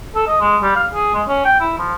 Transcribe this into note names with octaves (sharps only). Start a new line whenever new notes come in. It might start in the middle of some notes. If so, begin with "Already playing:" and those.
A4
D#5
G#3
G3
F5
G#4
G#3
C#4
G5
E4
F3